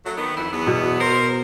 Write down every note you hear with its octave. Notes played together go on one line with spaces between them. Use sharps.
F#3 A3
D#3 B3
F2 E4
E2 F#3 B3
B2
A#4 C5